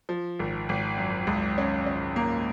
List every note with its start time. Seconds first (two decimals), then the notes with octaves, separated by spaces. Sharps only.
0.09 F3
0.39 G#1
0.69 G#1
0.97 F#2
1.27 C#2
1.58 C#4
1.86 C#4
2.16 A#3